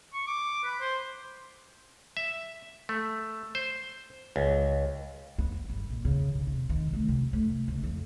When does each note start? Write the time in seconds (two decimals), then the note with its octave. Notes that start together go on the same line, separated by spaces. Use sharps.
0.13 C#6
0.27 D6
0.64 B4
0.80 C5
2.17 E5
2.89 A3
3.55 C5
4.36 C#2
5.38 B3
5.70 G1
5.90 A#1
6.05 C#3
6.35 B2
6.47 C3
6.69 D#3
6.93 A3
7.08 C3
7.33 A3
7.68 F#1
7.83 F2